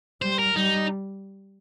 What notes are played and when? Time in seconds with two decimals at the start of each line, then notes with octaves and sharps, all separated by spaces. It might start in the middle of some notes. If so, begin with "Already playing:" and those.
0.22 G3 C5
0.39 A#4
0.55 G3 D#4